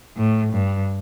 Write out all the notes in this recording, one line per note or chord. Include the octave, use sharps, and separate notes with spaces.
A2
G2